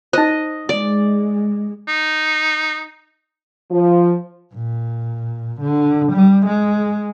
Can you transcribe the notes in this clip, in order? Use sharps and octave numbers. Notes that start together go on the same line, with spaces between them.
D#4 C5 D#5
G#3 D5
D#4
F3
A#2
D3
G3
G#3